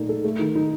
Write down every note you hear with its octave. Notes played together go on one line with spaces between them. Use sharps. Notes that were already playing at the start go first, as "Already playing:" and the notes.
Already playing: A#2 A3 D#4
A4
A3
D#3
D#4